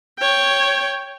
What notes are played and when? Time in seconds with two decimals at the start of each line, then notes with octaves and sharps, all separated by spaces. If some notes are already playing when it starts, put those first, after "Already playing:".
0.19 C#5 G5